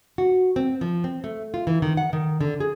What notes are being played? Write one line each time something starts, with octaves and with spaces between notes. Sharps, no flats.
F#4
C4
F3
C4
A3
F4
E3
D#3
F#5
D#3
D3
G#4